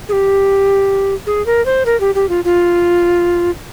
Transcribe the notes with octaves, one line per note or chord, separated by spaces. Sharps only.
G#4
G4
G#4
A#4
C5
A#4
G4
G4
F4
F4